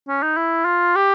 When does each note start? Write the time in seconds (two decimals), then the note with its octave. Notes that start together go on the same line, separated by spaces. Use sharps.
0.08 C#4
0.22 D#4
0.37 E4
0.65 F4
0.96 G4